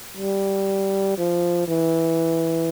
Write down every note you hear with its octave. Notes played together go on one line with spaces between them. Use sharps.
G3
F3
E3